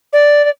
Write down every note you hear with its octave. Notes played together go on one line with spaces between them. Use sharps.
D5
D5